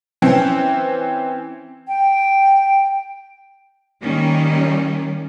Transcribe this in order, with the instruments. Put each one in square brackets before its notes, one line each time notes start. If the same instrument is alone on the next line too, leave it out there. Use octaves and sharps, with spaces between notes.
[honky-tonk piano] E3 C4 C#4
[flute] G5
[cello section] D#3 G3 A#3 C#4